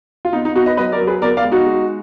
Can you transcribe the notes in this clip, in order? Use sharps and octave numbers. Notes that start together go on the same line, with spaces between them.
F4
B3 D#4
D#4
B3 D#4 F#4
B4 D#5
F#3 B4 D#5
A#4 D5
F#3
G#4 B4
B3 A#4 D5
D5 F5
G#3
D#4 F#4
G#3